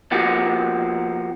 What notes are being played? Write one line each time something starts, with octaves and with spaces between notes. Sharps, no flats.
B2 F3 A#3 F#4 G4